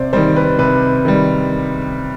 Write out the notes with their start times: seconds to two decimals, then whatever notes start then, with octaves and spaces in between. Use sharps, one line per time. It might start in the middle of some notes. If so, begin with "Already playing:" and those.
Already playing: C3 C5 D5
0.13 D#3 G3 C5
0.36 B4
0.59 C3 B4
1.05 D#3 G3